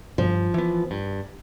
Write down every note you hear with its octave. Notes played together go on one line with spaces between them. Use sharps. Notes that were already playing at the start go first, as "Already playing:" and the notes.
G2 F3
E3 B3
G2